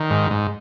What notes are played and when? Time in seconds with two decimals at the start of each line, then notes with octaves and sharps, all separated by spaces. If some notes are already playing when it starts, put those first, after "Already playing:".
Already playing: D#3
0.10 G#2
0.30 G#2